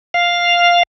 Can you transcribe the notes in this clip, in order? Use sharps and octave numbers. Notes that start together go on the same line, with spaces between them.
F5